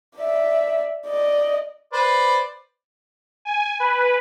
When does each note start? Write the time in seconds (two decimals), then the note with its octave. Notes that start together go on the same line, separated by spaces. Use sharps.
0.17 D5 E5
1.06 D5 D#5
1.93 B4 C5 D5
3.45 G#5
3.80 B4